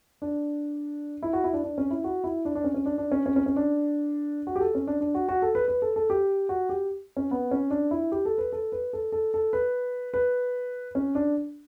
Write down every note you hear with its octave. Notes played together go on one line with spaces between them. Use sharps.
D4
E4
F#4
E4
D4
D4
C#4
E4
F#4
E4
D4
D4
C#4
C#4
D4
D4
C#4
C#4
C#4
C#4
D4
F#4
G4
A4
C#4
D4
D4
F#4
F#4
A4
B4
B4
A4
A4
G4
F#4
G4
C#4
B3
C#4
D4
E4
G4
A4
B4
A4
B4
A4
A4
A4
B4
B4
C#4
D4